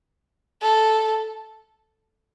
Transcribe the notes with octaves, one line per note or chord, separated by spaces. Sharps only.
A4